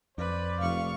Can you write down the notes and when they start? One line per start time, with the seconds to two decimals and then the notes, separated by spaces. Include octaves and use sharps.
0.18 F2 B4 C5 D5
0.60 F1 F5 C#6